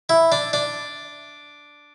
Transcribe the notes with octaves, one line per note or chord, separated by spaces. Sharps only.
E4
D4
D4